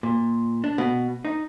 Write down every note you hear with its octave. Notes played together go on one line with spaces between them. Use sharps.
A#2
D4
B2
D#4